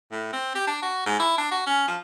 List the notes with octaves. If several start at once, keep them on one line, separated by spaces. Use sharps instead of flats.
A2
C4
G4
D4
F#4
G#2
E4
D4
F#4
C#4
F3